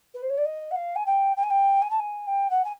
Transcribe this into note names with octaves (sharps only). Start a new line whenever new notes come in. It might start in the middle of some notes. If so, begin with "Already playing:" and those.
B4
C5
C#5
D5
D#5
F#5
F5
G#5
G5
G5
G#5
G5
G#5
A5
G#5
G5
F#5
G#5